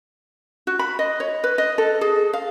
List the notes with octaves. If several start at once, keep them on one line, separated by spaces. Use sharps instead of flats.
F#4
B5
D#5
C#5
B4
D#5
A4
G#4
F5